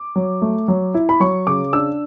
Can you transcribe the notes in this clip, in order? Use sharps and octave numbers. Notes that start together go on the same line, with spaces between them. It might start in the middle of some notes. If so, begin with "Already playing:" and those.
Already playing: D6
F#3
A3
F#3
E4
B5
F#3 C#6
C#3 D6
D4 E6